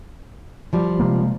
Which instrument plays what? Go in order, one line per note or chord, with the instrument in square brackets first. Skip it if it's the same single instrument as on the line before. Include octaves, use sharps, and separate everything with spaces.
[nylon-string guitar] F3 G3
[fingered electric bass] C3 G#3 A#3